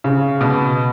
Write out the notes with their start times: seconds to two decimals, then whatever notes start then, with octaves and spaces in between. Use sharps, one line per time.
0.04 C#3
0.41 B2